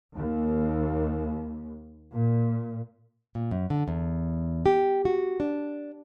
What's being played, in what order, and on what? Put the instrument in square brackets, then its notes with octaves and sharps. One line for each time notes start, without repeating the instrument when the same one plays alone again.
[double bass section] D#2
A#2
[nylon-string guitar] A#2
F#2
D3
E2
G4
F#4
D4